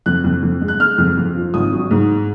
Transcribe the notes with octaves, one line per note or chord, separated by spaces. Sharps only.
F2 F#6
F2
F2
G#3
F#6
G#3 F6
F2
F2
F3
G#1 D#6
F#3
G#2